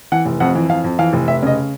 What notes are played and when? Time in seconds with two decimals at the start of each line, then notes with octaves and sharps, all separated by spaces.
0.12 E3 F#5
0.25 F1
0.40 F2 F#5
0.55 E3
0.69 F2 F5
0.84 F2
0.99 E3 F5
1.13 F1
1.27 F1 E5
1.43 C#3 D#5